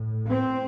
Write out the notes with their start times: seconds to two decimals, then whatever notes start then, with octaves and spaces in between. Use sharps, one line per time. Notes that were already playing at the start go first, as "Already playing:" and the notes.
Already playing: A2
0.30 C4